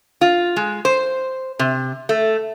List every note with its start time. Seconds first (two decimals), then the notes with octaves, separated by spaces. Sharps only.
0.21 F4
0.56 G#3
0.85 C5
1.59 C3
2.09 A3